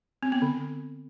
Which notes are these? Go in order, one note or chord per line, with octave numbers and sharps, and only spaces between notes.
C4
B3
D3